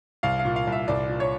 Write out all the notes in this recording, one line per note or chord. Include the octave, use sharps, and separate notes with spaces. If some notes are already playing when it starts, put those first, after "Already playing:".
C2 F5
F5
A#2
F5
C2
E5
C2 D5
A#2
C#5